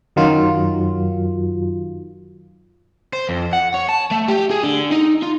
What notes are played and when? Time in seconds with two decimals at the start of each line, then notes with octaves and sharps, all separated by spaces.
0.16 F#2 D#3 F#3 F4
3.13 C5
3.29 F2
3.53 F#5
3.74 C#5
3.89 A5
4.11 A3
4.28 G4
4.51 G#4
4.64 D3
4.92 D#4
5.23 F4